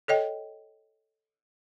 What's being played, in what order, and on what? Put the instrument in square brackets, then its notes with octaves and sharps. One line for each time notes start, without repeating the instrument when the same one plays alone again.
[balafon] A4 C#5 D#5 G5